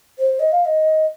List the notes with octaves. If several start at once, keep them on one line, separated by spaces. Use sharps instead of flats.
C5
D#5
F5
D#5